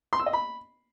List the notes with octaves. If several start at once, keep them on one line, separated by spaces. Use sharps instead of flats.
C6
E6
D#5
B5